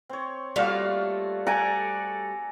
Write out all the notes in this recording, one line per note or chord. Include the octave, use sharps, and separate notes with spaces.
C4 C#5
G3 A3 A#3 F4 F#4 F5
A4 D5 F#5 G#5 A#5